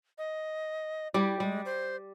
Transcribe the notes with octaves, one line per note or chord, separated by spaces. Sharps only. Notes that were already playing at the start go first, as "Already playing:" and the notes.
D#5
G3 E4 G4
G3 G#3
C5